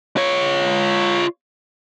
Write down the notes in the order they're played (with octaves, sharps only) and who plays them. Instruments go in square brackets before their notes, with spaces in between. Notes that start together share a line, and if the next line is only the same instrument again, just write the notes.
[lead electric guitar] F4 C#5